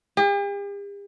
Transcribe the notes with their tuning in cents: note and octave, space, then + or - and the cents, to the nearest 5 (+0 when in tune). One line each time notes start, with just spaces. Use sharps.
G4 +45